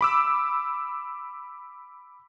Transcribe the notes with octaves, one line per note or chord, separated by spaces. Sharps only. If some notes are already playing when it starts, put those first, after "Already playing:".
B5 D6 E6